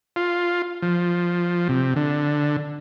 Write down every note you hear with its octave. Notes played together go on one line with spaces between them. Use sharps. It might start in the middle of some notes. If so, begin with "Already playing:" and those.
F4
F3
C3
D3